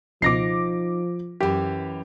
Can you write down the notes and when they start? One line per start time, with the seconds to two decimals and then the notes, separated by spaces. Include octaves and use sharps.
0.22 C#2 B2 F3 D#4 D6 A#6 C7
1.40 F#2 E3 G4